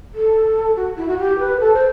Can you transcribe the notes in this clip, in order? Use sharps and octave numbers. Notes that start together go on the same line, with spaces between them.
A4
F#4
E4
F#4
G4
B4
A4
C5